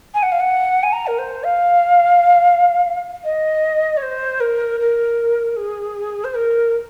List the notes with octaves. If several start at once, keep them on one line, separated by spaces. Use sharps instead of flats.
G#5
F#5
F5
F#5
G#5
A#5
A#4
C5
F5
D#5
C#5
C5
A#4
A#4
G#4
C5
A#4